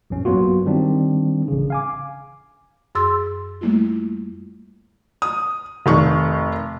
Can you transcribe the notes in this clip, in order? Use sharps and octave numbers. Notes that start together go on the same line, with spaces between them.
A#1 F#2 C#4
G2 F#3 A#3 B3 F4 F#4
D#3 G3 C4 D4
A1 C#3
F5 G#5 D6
F#2 G#4 C6 E6 A6
G3 A3 A#3 E4 F4
D#6
F1 D#3 C#6